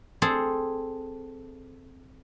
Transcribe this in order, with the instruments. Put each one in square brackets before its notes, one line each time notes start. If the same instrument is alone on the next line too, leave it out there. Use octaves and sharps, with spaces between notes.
[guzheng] C4 G#4 A4